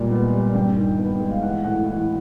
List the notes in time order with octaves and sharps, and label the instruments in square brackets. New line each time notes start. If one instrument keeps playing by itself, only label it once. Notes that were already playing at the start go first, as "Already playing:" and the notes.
Already playing: [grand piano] A#2 G3 G#3
B3
G3
G2 G5
D#3
B3
G#3
F5
E3 F#5
A2 F#5
E3 F#5